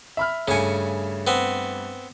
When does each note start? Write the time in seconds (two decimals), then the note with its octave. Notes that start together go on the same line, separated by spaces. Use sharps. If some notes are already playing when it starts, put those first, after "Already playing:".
0.17 E5 B5 F6
0.48 G2 C#3 A3 G#5 C#7
1.27 B3 C4